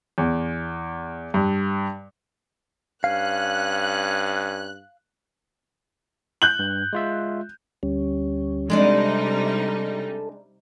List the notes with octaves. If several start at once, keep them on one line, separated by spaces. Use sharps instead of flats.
E2
G2
G2 C#4 F5 F#6
F#6 G6 F#7
G2
G#3 F4 E5
D2 G3 C#4
C3 G3 G#3 D4 D#4 A4 D5